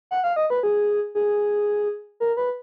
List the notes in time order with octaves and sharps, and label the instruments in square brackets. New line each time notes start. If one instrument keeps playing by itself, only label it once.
[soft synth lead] F#5
F5
D#5
B4
G#4
G#4
A#4
B4